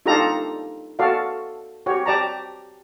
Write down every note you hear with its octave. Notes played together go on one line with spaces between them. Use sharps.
D4 D#4 F4 G4 A4 A#5
F#4 A4 D5 F5
F#4 G4 C#5
G4 D5 A5 A#5